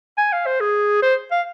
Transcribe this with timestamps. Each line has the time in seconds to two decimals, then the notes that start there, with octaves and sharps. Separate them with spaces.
0.18 G#5
0.33 F5
0.46 C5
0.60 G#4
1.02 C5
1.31 F5